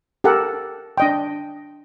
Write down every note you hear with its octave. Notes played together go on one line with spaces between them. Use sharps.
G4 A4 A#4 F#5
D4 D#5 G5